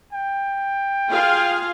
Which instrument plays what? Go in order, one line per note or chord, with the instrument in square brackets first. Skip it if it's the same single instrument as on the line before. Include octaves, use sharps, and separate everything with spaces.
[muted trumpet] G5
[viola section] F4 G#4 F5